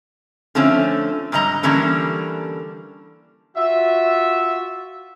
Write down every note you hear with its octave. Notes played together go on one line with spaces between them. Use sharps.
D3 F3 A3 C4 C#4
G#2 D3 G3 D#5 A#5
D3 E3 G3 A#3 C#4 D4
F4 F#4 E5